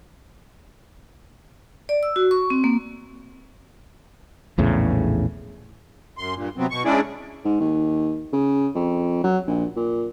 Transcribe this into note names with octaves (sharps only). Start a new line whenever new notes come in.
D5
E6
F#4
C#6
C4
A#3
A#1 E2 A2 C#3
F#2 C6
G2 A#2
C3 F#3 B3 C4
B2 C#6
G#3 C#4 D4 E4 G#4 D5
G#2
D#2
C#3
F2
F#3
A#1
A#2